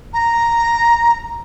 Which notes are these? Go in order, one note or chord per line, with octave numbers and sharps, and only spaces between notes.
A#5